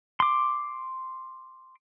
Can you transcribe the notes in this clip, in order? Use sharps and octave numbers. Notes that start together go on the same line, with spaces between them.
C6 D6